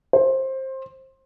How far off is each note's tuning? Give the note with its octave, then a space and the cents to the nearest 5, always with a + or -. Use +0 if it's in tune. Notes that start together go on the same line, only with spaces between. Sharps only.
C5 +20